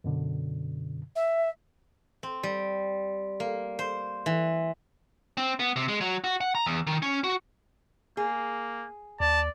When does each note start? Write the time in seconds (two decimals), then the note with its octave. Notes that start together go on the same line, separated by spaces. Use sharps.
0.04 F#2 B2 D3
1.15 E5
2.23 C4
2.43 G3
3.40 A#3
3.79 C5
4.26 E3
5.37 C4
5.60 B3
5.76 C3
5.88 G#3
6.01 F#3
6.24 F#4
6.41 F#5
6.55 A#5
6.66 E2
6.87 D#3
7.02 C#4
7.24 F#4
8.17 A#3 G#4
9.20 D#2 D5 A5